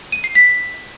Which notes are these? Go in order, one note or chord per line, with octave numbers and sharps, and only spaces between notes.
D#7
C7
B6